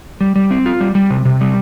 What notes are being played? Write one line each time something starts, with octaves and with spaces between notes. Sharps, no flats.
G3
G3
C4
F4
G3
G3
C3
C3
G3